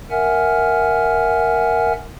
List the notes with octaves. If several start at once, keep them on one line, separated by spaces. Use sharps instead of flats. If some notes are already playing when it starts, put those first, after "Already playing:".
A#4 E5 F#5 G#5 F6